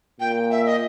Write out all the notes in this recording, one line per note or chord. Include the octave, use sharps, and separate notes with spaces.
A#2 G5
E5
D#5